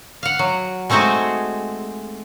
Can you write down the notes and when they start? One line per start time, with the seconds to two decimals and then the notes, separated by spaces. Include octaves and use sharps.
0.23 F5 F#5
0.39 F#3
0.90 G#3 A3 C4 D#4 F#4 G#4